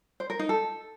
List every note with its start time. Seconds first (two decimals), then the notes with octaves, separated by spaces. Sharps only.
0.20 C5
0.30 A#4
0.39 D#4
0.49 A4